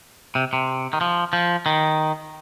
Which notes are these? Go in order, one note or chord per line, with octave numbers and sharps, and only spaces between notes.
C3
C3
D#3
F3
F3
D#3